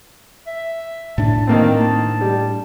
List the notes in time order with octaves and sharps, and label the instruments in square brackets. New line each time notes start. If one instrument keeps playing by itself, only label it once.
[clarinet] E5
[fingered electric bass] A2 D4 [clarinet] A5
[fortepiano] D#3 A#3 C4
G3